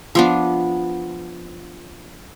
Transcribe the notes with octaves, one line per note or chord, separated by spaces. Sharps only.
F3 B3 D4